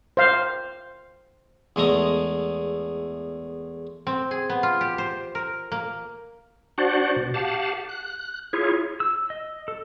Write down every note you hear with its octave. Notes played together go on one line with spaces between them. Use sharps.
C5 F5
E2 G#3 A3 A#5
C4
G#4
B3
F4
G4
C5
A#4
A#3
D4 F#4 C5 D5 F#5
B2
G4 F5 F#5 A5
F#6
E4 F4 G#4 C#5
E6
D#5
A4